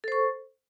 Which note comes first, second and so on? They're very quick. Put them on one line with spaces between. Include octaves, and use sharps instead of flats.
A4 C5 C#6